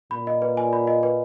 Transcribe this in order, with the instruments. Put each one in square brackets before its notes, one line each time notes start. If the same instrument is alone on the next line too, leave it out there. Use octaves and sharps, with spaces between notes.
[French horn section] A#2 [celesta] B5
[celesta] D#5
B4
G#5
B5
D#5
B4